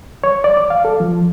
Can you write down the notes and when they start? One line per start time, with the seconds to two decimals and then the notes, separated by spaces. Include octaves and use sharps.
0.24 C#5
0.44 D5
0.57 D6
0.70 F5
0.85 A4
1.00 F3